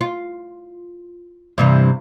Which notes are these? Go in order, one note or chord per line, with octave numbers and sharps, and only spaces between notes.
F4
G2 C3 E3